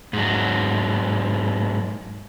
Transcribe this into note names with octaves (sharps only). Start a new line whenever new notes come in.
G#2 F#3